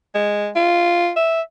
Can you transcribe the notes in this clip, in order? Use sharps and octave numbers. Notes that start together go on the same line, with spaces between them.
G#3
F4
E5